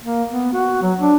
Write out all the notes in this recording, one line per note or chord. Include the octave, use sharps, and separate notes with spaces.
A#3
B3
F#4
F#3
D4